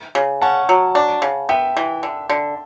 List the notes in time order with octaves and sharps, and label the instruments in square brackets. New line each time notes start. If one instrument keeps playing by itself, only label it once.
[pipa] C#3
[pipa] C#4 [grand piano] F#5 A5
[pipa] F#3
D4
C#3
[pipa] B3 [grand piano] E5 G5
[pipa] E3
D3
D3